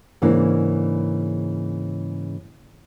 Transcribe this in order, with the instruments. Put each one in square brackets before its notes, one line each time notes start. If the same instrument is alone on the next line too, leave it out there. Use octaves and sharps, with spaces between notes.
[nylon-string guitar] G#2 C#3 E3 A#3 D4